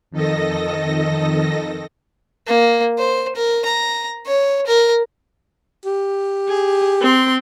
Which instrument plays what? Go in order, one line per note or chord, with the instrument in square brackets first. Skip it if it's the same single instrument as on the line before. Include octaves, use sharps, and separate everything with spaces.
[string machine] F2 D#3 A4 D#5 A#6
[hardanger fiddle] A#3
C5
A#4
A#5
C#5
A#4
[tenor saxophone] G4
[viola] G#4
C4 C6